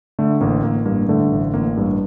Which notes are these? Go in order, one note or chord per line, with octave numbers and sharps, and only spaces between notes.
D3 A3
A1 A#3
A1 A#3
G2 A#3
D3 A3
A1
A1 A#3
G2